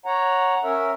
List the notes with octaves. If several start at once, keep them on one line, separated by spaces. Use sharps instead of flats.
C#5 F#5 A#5
C#4 A#4 E5